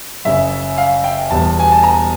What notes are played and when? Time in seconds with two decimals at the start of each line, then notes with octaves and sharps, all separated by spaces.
0.25 F#1 F#2 C#3 E5
0.78 F5
1.04 G5
1.31 E1 E2 B2 G3 A5
1.60 G#5
1.72 A5
1.83 A#5